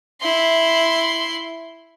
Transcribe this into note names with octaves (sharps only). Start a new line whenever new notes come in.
E4 C6